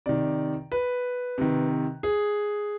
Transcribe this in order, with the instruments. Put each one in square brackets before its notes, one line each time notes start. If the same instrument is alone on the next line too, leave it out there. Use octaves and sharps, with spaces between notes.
[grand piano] C3 D#3 D5
B4
C3 D#3
G#4